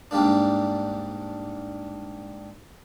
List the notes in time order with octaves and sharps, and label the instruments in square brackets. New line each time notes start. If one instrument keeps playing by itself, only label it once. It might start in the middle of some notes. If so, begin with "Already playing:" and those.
[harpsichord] G#2 G3 A#3 D4